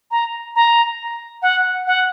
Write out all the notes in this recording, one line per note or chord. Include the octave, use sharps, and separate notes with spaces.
A#5
A#5
F#5
F#5